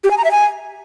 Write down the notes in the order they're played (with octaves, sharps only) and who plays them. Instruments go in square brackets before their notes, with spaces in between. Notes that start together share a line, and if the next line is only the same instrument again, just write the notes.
[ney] G4
G#5
A#5
E5
G#5